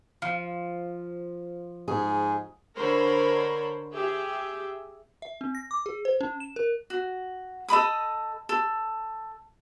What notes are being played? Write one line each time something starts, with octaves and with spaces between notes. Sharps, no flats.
F3
G#2 G#4
D3 A#4 C5 C#5 B5
G4 G#4 E5
E5
C4
A#6
D6
G#4
C5
C#4
E7
A#4
F#4
A4 D#5 B5 D#6
A4